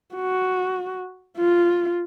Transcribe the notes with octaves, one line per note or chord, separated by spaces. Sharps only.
F#4
F4